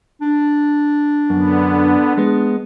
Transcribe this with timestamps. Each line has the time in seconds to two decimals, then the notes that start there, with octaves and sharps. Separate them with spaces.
0.21 D4
1.30 F#2 D3 B3
2.17 G#3 B3